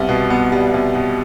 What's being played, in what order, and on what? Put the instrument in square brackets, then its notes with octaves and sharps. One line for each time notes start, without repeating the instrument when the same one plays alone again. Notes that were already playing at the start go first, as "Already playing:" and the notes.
Already playing: [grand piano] C2 G3 B3
B2
B3
G3
C2
B2